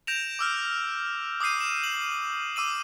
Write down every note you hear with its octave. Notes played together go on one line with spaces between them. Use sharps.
G6 A#6 D7 E7 F7
D6 E6 F6
D6 D#6 G6 C7 D#7
E7
F#7
D6 E6 D#7 F#7